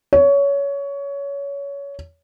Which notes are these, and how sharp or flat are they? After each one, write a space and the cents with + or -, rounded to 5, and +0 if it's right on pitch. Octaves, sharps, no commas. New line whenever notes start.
C#5 +20